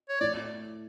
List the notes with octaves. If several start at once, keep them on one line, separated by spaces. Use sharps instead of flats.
C#5
A2 D5